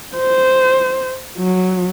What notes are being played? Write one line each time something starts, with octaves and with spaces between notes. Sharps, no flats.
C5
F#3